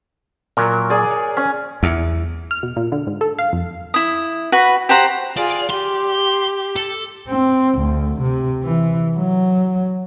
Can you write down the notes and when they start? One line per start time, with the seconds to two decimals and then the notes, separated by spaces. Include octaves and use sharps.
0.57 A#2 F#3 A#4
0.90 G#4 D5
1.11 C#5
1.37 C#4
1.83 E2
2.51 F6
2.63 B2
2.76 A#2
2.92 D3
3.07 G#2
3.21 A4
3.39 F5
3.53 F2
3.94 E4 D#6
4.52 F#4 B4 F#5 B5
4.89 G4 C5 F#5 A#5
5.37 F4 G#4 D5
5.70 G4 C6
6.76 A4
7.29 C4
7.79 D2
8.22 C3
8.64 E3
9.18 F#3